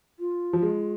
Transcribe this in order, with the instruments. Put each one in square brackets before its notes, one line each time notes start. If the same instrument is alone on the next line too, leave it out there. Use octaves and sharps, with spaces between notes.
[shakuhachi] F4
[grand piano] F3
G#3